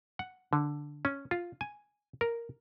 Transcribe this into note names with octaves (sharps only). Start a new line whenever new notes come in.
F#5
D3
C#4
F4
G#5
A#4